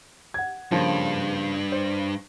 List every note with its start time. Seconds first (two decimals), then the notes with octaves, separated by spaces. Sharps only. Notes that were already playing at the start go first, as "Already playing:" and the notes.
0.34 F#5 G#6
0.71 G2 C#3 F3 A#3
1.72 C5